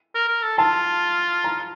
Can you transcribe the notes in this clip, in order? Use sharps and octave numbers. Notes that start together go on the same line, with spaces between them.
A#4
A#4
A4
F4 A5
A#5